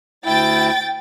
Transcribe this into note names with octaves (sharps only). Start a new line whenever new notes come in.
D2 E4 G5 A6